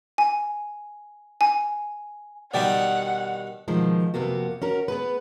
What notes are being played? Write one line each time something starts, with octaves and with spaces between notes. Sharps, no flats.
G#5
G#5
B2 D#3 G3 D5 F#5 G5
B2 D#3 F3 G#3
F2 C3 A#3 B3 F#4
C#4 F#4 A#4
B3 G#4 B4